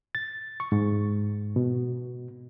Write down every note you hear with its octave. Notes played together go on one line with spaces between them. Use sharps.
A6
C#6
G#2
B2